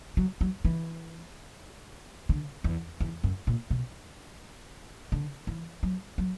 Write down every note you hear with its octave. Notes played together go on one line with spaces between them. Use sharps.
F#3
F#3
E3
D3
E2
E2
F#2
A#2
B2
D3
E3
F#3
F#3